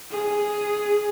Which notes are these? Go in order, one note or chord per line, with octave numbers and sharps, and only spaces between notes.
G#4